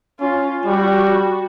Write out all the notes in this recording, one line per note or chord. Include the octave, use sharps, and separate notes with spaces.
C#4 F4
G3 F#4